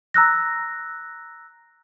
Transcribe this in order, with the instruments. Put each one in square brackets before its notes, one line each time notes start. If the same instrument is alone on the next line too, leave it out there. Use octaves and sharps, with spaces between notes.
[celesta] A#5 E6 F#6 A#6